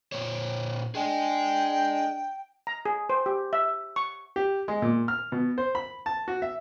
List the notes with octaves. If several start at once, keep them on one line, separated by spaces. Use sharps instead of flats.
A#2 C5 C#5
D4 G#4 D#5 G5 G#5
A#5
G#4
C5
G4
E5
C#6
G4
G#3
A#2
F6
B2
C5
B5
A5
F#4
E5